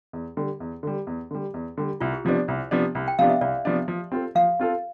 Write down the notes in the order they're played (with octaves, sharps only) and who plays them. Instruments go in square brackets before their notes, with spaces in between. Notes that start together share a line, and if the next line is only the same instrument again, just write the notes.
[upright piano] E2
D3 G3
E2
D3 G3
E2
D3 G3
E2
D3 G3
[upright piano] C2 [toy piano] F4
[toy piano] G4
[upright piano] C3 F3 B3 D4 [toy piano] C5
[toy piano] D5
[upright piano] C2
C3 F3 B3 D4
C2
[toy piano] G5
[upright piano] C3 F3 B3 D4 [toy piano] F5
[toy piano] E5
[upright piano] C2 [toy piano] D5
[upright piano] C3 F3 B3 D4
F3
C4 F4 A4
[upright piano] F3 [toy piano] F5
[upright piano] C4 F4 A4